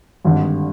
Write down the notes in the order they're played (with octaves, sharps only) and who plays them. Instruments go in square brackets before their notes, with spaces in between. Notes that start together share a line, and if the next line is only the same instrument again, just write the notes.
[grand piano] G#1 G2 D3